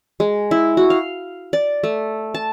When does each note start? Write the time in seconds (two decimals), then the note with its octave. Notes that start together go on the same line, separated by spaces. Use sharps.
0.20 G#3
0.51 E4
0.77 F#4
0.90 F5
1.53 D5
1.83 A3
2.34 A5